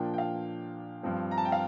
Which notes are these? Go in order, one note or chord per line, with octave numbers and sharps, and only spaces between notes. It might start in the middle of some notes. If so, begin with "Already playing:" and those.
Already playing: A#2 F3 A#3 D4 G5
G5
F5
G2 F3 C4
A#5
A5
G5
F5